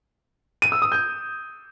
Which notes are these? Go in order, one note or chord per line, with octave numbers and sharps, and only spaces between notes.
D#7
E6
D#6
G6